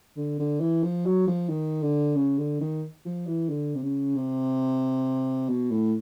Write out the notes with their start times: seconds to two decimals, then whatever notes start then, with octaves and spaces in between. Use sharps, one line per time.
0.17 D3
0.39 D3
0.61 E3
0.84 F3
1.06 F#3
1.28 F3
1.49 D#3
1.82 D3
2.16 C#3
2.38 D3
2.61 D#3
3.06 F3
3.27 E3
3.49 D3
3.75 C3
3.83 C#3
4.16 C3
5.49 B2
5.71 A2